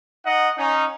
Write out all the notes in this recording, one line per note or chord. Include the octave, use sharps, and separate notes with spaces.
D#4 D#5 F#5
C#4 D#4